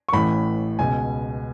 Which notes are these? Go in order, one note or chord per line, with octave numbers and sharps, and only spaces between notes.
C#6
A1 A2 E3 B5
C#2 B2 G#5